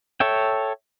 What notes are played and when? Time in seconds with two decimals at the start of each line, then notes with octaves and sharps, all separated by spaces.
0.20 A4 C#5 E5 G5